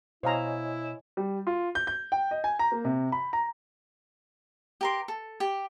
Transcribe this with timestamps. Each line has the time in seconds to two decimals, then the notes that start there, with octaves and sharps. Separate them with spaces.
0.23 B2 E4 C5 C#5 D#5 F5 G#5 A#5
1.17 G3
1.47 F4
1.75 G6
1.87 G6
2.12 G5
2.31 D#5
2.44 G#5
2.59 A#5
2.72 A#3
2.85 C3
3.12 B5
3.33 A#5
4.81 G4 A#4 C6
5.08 A4
5.40 G4